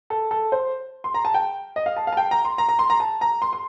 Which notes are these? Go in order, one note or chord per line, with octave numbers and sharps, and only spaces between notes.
A4
A4
C5
C6
A#5
A5
G5
D#5
F5
A5
F5
A5
G5
A#5
C6
A#5
A#5
C6
A#5
A5
A#5
C6
C6